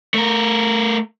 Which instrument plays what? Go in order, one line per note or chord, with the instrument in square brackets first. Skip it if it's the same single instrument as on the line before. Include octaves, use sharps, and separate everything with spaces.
[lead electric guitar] A3 A#4